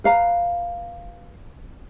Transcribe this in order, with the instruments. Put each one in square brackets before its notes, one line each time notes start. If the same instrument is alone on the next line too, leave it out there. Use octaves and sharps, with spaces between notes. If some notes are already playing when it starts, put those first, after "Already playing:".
[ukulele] B4 F5 A#5